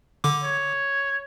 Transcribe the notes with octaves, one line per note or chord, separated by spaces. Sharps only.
D3 D6
C#5